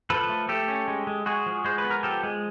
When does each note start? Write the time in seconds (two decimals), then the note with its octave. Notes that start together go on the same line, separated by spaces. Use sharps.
0.10 F3 A4 B4
0.29 A3
0.49 A3 G4 A4
0.68 C#4
0.88 G#3
1.07 G#3
1.26 G#3 F#4 G#4
1.46 F3
1.65 G#3 C5
1.78 B4
1.84 B3
1.91 A#4
2.03 F3 G4 A4
2.23 G#3